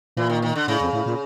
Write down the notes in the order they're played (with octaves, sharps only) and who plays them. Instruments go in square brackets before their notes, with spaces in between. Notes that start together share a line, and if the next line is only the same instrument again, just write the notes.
[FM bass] A#2 [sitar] E3
[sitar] D#3
D#3
D3
[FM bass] A2 [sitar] C#3
[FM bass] F2
A2
A#2